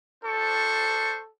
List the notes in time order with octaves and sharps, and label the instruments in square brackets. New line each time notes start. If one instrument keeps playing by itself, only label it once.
[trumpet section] D4 C5 C#6 [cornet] A4